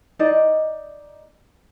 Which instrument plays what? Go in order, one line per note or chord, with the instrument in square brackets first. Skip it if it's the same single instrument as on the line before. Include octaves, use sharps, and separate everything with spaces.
[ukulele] D#4 D5 D#5